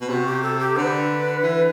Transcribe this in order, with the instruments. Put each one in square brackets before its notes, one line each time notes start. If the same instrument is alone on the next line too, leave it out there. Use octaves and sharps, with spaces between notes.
[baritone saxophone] B2
[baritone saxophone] C3 [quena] F#4
[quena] G4
A4
G4
[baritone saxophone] D3 [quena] B4 C5
[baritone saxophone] E3